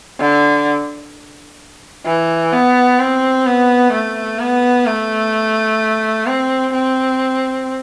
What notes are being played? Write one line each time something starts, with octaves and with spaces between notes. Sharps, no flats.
D3
E3
B3
C4
B3
A3
B3
A3
C4
C4